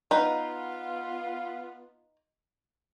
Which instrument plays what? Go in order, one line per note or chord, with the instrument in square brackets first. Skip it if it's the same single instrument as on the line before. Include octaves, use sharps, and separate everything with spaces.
[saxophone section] B3 F4 [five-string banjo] D#4 B4